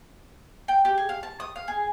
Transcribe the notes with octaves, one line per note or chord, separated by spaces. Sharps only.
G5
G4
G#4
F5
A5
D#6
F5
G#4